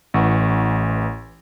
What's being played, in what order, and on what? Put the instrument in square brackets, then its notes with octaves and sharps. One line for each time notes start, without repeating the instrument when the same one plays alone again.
[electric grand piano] A1 E3 F#5 C#6